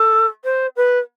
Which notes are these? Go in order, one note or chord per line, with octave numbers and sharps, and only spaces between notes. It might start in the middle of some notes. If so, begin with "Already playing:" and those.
Already playing: A4
C5
B4